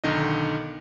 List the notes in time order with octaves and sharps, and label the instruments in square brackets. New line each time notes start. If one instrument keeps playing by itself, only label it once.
[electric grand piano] B1 D3 D#3 A#4 D#5